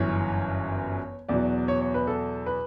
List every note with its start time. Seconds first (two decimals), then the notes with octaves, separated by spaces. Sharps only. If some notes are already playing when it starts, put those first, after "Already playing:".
Already playing: G1 F#2 E3 C#5
1.29 E2 B2 F#3 D5
1.68 C#5
1.81 C#5
1.94 B4
2.07 A4
2.46 B4